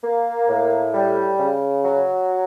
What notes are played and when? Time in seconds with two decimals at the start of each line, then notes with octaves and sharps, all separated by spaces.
0.03 A#3
0.49 A2
0.94 G3
1.39 C#3
1.84 F#3